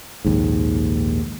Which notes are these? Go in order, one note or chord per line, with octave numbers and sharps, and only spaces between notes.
A#1 D#2 G#2